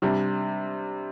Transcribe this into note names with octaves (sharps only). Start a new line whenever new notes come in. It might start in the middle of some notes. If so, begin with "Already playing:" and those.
C3 G3 D4